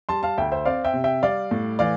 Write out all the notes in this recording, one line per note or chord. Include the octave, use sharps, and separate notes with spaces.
G3 A5 C6
F5 A5
D2 E5 G5
C5 E5
C4 D5 F5
E5 G5
C3
E5 G5
G3 D5 F5
A2
E3 D5 F5